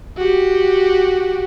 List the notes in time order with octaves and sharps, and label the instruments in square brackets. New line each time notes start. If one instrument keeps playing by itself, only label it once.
[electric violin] F#4 G4